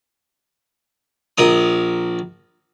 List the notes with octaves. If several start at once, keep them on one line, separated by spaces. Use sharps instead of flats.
A#1 A#4 D#6